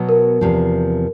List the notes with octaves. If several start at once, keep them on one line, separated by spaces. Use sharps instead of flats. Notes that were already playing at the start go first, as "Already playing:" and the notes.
Already playing: B2 F#3 B3
A#4
E2 C3 F3